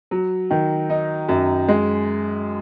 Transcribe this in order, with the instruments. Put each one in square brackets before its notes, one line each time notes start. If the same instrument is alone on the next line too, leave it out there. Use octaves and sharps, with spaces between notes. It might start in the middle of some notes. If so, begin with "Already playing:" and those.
[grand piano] F#3
D#3
D#4
F#2
G#3